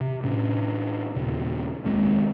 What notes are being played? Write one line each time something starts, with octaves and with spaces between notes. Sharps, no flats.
C3
A2 C#4 D4
D#2 A#2 C#3
F1 D#2 G#3 C4